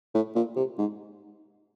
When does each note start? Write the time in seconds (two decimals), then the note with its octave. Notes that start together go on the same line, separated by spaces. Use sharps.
0.14 A2
0.35 A#2
0.56 C3
0.78 G#2